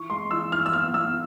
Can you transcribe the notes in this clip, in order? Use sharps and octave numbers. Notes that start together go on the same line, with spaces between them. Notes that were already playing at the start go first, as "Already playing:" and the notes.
Already playing: E3 C#6
G#3 C6
E3 E6
E3 F6
E6
B3 F6
B3 E6